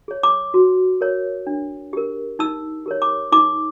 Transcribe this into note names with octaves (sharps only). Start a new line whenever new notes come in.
G#4 C#5
D6
F#4
A#4 C#5
D4
G4 A#4
D#4 E6
G4 A#4 C#5
D6
D#4 D6